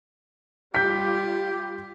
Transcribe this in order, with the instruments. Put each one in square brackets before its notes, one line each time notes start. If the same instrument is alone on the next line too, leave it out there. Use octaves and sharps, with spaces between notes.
[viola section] G3 F4 [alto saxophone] G4 [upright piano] G6 B6